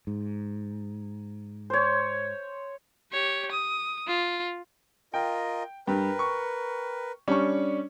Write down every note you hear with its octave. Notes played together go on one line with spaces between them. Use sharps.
G#2
C5 C#5
G4 C#5
D#6
F4
F4 A#4 D#5 G5
G2 A#4 B4 G5
C#6
G3 C#4 D4 C#6